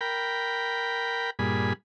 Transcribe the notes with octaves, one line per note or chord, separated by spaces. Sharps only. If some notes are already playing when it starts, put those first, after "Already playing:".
A#4 G5 B5
G2 A#2 G#4 B5